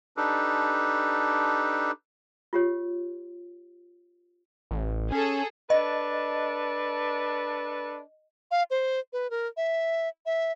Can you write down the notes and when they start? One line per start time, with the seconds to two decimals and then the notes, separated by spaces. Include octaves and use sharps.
0.17 D4 D#4 G4 A4 B4
2.53 F4 G4 C#5
4.71 A1
5.12 C#4 G#4 A4
5.70 D4 A4 B4 D#5
8.51 F5
8.71 C5
9.13 B4
9.30 A#4
9.57 E5
10.26 E5